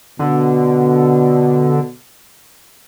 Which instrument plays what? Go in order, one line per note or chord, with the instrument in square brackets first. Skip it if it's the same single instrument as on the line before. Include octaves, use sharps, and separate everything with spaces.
[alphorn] B2 [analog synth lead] D3